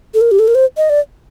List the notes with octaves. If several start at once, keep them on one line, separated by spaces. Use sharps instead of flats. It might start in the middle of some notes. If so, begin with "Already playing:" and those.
A4
A#4
G4
A4
A#4
C5
D#5
D5